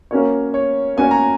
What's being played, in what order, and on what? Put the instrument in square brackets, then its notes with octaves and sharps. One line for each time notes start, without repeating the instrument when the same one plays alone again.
[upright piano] A#3 C#4 F#4 A#4 C#5
[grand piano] C#5
[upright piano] A#3 C#4 F#4 A#4 C#5 [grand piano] G#5
[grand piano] A#5